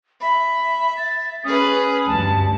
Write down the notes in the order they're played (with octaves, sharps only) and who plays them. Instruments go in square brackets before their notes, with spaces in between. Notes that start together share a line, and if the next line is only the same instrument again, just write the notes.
[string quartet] E5 [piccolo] B5
[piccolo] A6
[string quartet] C#4 G#4 B4 [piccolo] D#6
[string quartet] D2 G2 [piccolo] A5